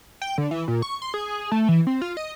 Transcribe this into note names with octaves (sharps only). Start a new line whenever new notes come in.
G5
D3
E3
A#2
C#6
C6
G#4
A3
E3
C4
F4
D#5